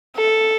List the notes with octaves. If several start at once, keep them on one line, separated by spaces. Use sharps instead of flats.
A4